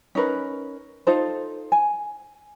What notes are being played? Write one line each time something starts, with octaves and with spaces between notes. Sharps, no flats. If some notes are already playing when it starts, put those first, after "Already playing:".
C#4 D#4 A#4 B4
D#4 F4 A4 C5
G#5